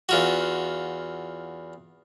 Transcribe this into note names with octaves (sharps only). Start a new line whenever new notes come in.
E2 F4 F#4